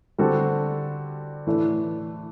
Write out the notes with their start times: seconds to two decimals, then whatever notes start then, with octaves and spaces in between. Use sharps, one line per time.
0.18 D3 G3 C4 F#4 A4
1.47 A2 E3 A3 D4